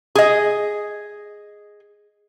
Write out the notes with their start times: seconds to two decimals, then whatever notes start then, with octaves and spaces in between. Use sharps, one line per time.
0.15 G#4 D#5